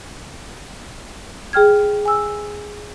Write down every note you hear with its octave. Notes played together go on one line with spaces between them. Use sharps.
G#4 G5 F6 G#6
G#5 E6